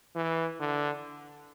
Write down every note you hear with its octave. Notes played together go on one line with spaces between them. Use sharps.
E3
D3